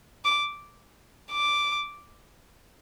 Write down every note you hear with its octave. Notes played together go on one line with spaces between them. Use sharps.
D6
D6